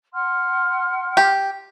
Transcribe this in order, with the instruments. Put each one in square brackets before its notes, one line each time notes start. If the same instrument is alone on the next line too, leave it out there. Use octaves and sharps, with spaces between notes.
[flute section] F#5 C6 F6
[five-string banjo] G4